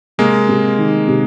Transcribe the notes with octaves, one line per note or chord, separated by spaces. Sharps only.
C3 G#3 A#3
C3
D#3
C3